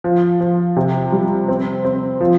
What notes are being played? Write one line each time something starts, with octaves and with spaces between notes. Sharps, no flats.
F3
F3
C3
G3
C4
C4
F3